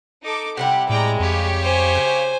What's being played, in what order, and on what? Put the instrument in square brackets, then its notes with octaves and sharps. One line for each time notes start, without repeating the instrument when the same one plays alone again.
[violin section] D#4 A4 D6
[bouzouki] C3 G3 E4 [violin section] G4 [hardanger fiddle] F#5
[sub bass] A2 [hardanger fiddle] G#3 [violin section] D5 G5 A#5
[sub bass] F2 [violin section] G4 C#5 F5
[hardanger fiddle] C5 G#5
[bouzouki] C#3